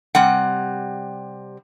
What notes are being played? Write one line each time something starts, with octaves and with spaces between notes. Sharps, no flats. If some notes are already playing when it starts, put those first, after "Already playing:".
C3 G3 F#5